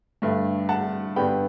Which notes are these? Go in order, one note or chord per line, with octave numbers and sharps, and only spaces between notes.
G2 D3 A3
F#5 A5
G2 D3 G3 B3 G5 B5